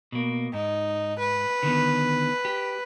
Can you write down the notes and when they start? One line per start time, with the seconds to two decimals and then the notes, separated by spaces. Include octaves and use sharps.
0.12 B2 A#3
0.53 G#2 D#4
1.19 B4
1.63 D3 D#3 B3
2.45 G4